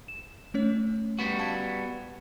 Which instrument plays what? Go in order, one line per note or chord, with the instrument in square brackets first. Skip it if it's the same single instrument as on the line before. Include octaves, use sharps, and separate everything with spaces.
[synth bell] E7
A3 C#4 C#5
[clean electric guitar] G3 B3 F#4
[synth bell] F5 A5 G#6